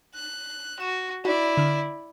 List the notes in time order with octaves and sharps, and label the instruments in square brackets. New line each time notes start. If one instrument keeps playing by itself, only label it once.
[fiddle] F#6
[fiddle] F#4 [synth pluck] E7
[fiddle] E4 D5 [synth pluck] F#4
[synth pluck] D3 F6